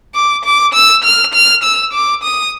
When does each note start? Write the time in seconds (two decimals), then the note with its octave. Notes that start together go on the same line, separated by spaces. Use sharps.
0.15 D6
0.45 D6
0.74 E6
1.04 F6
1.34 F6
1.63 E6
1.93 D6
2.23 D#6